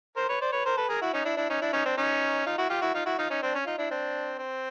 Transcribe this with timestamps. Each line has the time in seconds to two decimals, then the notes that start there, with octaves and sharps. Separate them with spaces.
0.16 A#4 C5
0.29 B4 C#5
0.41 C5 D5
0.52 B4 C#5
0.65 A#4 C5
0.77 A4 B4
0.89 G#4 A#4
1.02 E4 F#4
1.13 C#4 D#4
1.25 D4 E4
1.37 D4 E4
1.50 C#4 D#4
1.62 D4 E4
1.73 C#4 D#4
1.86 C4 D4
1.97 C#4 D#4
2.46 D#4 F4
2.58 E4 F#4
2.70 F4 G4
2.82 E4 F#4
2.94 D#4 F4
3.06 E4 F#4
3.18 D#4 F4
3.30 C#4 D#4
3.43 C4 D4
3.55 C#4
3.66 D#4 F4
3.78 D4 E4
3.91 C4 D4
4.39 C4